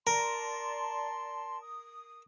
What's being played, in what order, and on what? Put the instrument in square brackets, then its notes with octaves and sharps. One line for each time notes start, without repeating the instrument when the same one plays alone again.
[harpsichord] A#4 [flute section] D5 A5 C6 [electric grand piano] A#5
[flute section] D#6